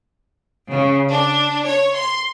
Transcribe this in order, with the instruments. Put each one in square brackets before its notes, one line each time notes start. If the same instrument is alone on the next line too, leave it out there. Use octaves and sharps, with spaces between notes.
[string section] C#3
D4
C#5
C6